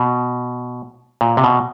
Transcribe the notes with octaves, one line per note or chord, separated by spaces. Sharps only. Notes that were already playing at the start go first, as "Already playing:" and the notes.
Already playing: B2
A#2
C3
B2